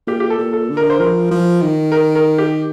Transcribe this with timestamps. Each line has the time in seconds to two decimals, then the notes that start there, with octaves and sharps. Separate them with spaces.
0.07 A#2 G4
0.20 G4
0.30 A4
0.38 A#2
0.53 A4
0.70 D3
0.77 A#4
0.90 C5
0.99 F3 A#4
1.31 F3
1.61 D#3
1.92 A#4
2.15 A#4
2.38 G4